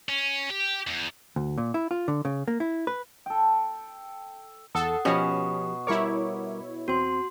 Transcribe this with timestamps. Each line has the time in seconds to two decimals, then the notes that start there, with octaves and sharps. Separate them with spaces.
0.09 C#4
0.50 G4
0.87 E2
1.36 D2
1.58 A#2
1.74 E4
1.91 F4
2.08 D3
2.25 C#3
2.48 A#3
2.60 E4
2.87 B4
3.26 A4 G5
4.75 E2 A4 F#5 D#6
5.05 B2 F3 C#4 G4
5.87 G3 E4 A#4 C#5 D6
6.88 E2 C4 F#4 C6